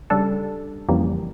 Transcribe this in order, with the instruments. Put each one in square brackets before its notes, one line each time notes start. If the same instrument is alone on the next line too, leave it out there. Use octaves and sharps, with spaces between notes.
[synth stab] C#3 G3 D4 A4
F2 C#3 E3 G3 A#3